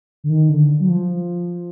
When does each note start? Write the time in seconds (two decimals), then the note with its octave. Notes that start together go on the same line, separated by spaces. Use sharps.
0.24 D3
0.30 D#3
0.49 D3
0.80 F#3
0.89 F3